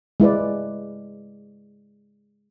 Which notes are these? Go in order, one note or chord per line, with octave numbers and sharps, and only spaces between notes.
G#3 E4 B4 D5